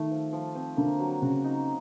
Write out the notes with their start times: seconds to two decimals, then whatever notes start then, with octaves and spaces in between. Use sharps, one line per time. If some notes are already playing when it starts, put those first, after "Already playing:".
Already playing: D#3 A3
0.11 F3
0.33 F3
0.55 C4
0.77 D3 A#3
0.99 F#3
1.22 C#3 F#4
1.44 D#4